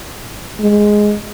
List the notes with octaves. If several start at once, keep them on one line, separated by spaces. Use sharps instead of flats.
G#3